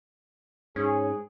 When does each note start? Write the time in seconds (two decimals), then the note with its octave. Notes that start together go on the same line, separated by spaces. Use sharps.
0.76 G#2 C#4 G#4